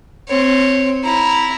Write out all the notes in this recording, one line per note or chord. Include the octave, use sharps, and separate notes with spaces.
C4 C#5
E4 A#5